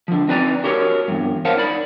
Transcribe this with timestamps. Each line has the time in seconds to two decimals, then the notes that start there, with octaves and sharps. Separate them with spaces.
0.08 D3 F3
0.28 C4 D#4 B4 D5 G#5 A#5
0.64 F#4 G4 A#4 C#5
1.08 E2 G2
1.45 A#4 C5 C#5 F5 F#5 A5
1.57 D#4 D5 B5